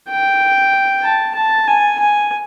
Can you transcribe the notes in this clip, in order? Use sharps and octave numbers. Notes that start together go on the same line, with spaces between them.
G5
A5
A5
G#5
G#5